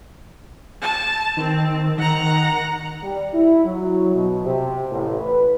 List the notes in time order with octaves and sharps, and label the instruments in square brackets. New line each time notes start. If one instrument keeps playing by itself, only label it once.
[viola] A5
[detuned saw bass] D#3 [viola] C4
[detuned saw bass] D#3 [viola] F#5 A#5
[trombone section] G3
E4
F#3
B2
C3
A1
B4